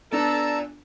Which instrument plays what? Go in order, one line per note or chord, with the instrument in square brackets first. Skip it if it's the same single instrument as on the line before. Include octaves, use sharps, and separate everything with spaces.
[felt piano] B3 D4 [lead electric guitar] F4 D5 [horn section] A4 [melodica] A5 A#5 E6